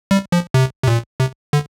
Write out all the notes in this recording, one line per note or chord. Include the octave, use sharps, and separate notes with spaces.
G3
F3
C3
C3
A#2
C3
D3